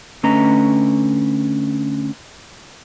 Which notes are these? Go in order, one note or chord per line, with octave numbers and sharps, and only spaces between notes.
D3 A3 C#4 B4 D#5 A#5